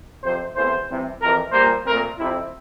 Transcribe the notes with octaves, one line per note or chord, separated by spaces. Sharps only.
F2 C3 F3 C4 C5
E2 E3 A3 C4 C5
C3 E3 G3 C4
F2 C3 E3 A#4
A#2 G3 A#3 C5
A#2 A3 C4 A#4
F2 C3 F3 C4 E4